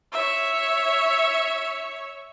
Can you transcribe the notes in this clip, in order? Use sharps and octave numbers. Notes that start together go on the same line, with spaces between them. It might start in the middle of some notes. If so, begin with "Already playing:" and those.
C#5 E5